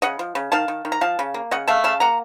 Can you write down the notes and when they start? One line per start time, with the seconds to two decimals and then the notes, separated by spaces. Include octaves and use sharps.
0.02 C#3 D#5 F#5
0.19 F3
0.35 C#3
0.52 D#3 F5 A5
0.68 D#3
0.85 D#3
0.92 A#5
1.01 F3 F5 A5
1.19 C#3
1.34 A#3
1.51 C#3 D#5 F#5
1.68 A3 F5 A5
1.84 C#3 F5 A5
2.00 A#3 F#5 A#5